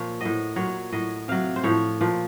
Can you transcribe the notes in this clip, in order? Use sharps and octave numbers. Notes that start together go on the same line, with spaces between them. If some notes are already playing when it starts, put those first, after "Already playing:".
Already playing: A#2 F3 C#5
A2 F#3 D#5
A#2 F#3 C#5
A2 F#3 D#5
C3 F#3 F5
C5
A2 F3 C#5
A#2 F3